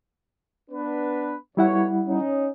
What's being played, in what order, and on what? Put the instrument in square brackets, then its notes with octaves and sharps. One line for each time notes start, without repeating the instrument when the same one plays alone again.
[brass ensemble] B3 D4 B4
[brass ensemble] B1 C#5 [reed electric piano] G3 E4 F#5
[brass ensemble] C#4 D#4